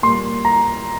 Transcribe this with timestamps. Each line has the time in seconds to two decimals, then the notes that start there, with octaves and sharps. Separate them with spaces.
0.02 A#2 G3 A#3 C6
0.45 A#5